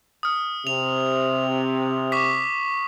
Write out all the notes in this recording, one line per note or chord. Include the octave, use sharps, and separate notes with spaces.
D#6 F6
C3 F7
C#6 D6 B6